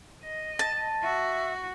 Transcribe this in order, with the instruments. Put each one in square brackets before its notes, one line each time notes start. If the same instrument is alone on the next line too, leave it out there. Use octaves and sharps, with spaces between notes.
[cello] D#5
[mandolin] A5
[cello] F#4 [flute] E5